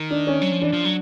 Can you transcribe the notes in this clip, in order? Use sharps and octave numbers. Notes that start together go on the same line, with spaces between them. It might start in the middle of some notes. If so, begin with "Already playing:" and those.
Already playing: D#3
D4
C#4
F#3
F3
E3 D4
F3
F#3